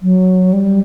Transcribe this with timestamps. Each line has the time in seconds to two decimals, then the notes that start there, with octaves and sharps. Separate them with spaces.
0.02 F#3
0.53 G3